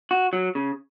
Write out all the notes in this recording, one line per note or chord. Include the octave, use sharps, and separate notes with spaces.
F#4
F#3
C#3